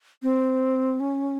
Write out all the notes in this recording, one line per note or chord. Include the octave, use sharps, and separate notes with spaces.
C4
C#4